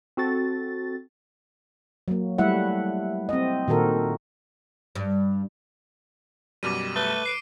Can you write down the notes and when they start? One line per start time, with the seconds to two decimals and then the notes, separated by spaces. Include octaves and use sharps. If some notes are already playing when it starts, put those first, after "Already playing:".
0.17 C4 F#4 A4 A6
2.08 F#3 A#3
2.38 G3 A3 E4 E5 F#5
3.29 C4 D#5
3.68 A#2 D#3 F#4 A4 A#4
4.95 G2
6.63 F#2 B2 G3 D6 D#7
6.96 A3 B4 G7
7.26 C7 D7